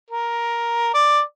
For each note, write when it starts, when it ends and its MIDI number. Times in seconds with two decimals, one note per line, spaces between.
0.10 0.90 70
0.94 1.20 74